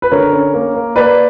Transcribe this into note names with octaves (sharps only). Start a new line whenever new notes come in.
B4
D3 A#4 C#5
C#4
A#3
A#3
A#3 B4 D5